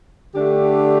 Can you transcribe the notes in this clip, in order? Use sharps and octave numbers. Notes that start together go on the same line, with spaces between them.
D3 A3 D4 G4